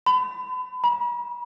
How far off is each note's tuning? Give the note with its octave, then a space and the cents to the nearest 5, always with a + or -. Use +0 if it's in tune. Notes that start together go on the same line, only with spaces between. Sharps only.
B5 +35
B5 -45